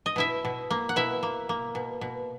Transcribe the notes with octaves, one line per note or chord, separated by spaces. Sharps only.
D#5
B2 E4 E5
B2
A#3
F#5
B2 E4 E5
A#3
A#3
B2
B2